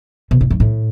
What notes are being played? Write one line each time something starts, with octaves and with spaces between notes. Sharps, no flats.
B2
A2
G2
A2